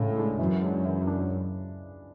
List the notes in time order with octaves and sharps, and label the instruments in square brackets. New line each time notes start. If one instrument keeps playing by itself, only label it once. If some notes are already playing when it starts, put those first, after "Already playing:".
Already playing: [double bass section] A2 [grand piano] C#3 G#3 D4
[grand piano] G#3 D4
[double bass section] F#2 [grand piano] E3
[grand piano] G#3 D4
E3
D4